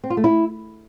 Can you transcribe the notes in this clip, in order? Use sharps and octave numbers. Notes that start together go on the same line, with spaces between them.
C4
F4
A3
E4